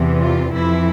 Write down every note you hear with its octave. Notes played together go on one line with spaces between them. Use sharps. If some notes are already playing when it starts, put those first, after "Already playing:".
Already playing: E2 C3 E3
F4
F2 E3 E4